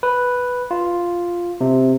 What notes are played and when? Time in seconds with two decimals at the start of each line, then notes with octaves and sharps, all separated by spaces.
0.03 B4
0.71 F4
1.61 C3